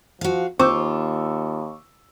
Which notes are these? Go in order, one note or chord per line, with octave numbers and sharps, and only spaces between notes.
F3 F#4 F5
D#2 C4 F4 C#6 D6 E6